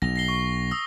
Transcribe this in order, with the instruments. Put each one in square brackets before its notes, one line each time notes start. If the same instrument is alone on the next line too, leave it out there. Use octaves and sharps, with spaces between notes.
[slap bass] B1 [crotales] A#6 F7
[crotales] A#6 C7 G7
C#6
D#6 E6